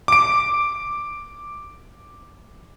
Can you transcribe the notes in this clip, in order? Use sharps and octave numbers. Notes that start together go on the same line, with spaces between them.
D6 D7